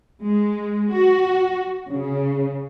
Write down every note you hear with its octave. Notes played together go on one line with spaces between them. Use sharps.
G#3
F#4
C#3